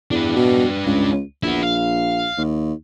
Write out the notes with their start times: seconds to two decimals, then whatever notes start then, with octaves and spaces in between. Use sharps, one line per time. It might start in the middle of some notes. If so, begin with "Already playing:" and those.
0.11 E2 D4 B4
0.36 B2
0.86 C#2
1.43 A#1 B3 E4
1.63 F5
2.38 D#2